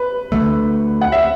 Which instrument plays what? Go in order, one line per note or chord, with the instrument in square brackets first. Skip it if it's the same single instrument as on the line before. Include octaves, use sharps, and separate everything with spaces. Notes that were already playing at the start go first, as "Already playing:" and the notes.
Already playing: [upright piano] B4
[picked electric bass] D2 D3 A3
[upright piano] F#5
E5